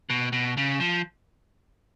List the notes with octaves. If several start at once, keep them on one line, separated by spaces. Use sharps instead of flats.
B2
B2
C#3
F3